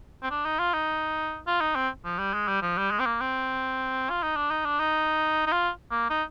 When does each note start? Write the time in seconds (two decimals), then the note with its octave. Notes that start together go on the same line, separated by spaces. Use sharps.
0.23 C4
0.31 D4
0.45 D#4
0.59 F4
0.74 D#4
1.47 F4
1.61 D#4
1.75 C4
2.04 F3
2.19 G3
2.33 G#3
2.48 G3
2.62 F3
2.77 G3
2.91 G#3
2.99 C4
3.06 A#3
3.21 C4
4.10 F4
4.23 D#4
4.36 D4
4.51 D#4
4.65 D4
4.80 D#4
5.46 D#4
5.52 F4
5.91 A#3
6.10 D#4